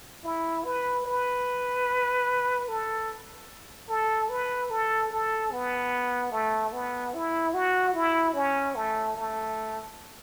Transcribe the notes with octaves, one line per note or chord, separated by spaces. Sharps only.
E4
B4
B4
A4
A4
B4
A4
A4
B3
A3
B3
E4
F#4
E4
C#4
A3
A3